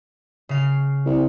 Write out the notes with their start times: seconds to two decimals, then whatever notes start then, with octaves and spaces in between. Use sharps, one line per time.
0.49 C#3 F5
1.06 C2